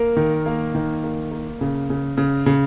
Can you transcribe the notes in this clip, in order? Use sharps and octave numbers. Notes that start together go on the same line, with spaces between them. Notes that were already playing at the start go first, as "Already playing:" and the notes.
Already playing: A#3 A#4
D#3
A#3
D#3
A#3
A#3
C#3
C#3
C#3
C#3